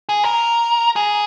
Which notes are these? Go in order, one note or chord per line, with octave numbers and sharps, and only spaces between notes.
G#4
A#4
G#4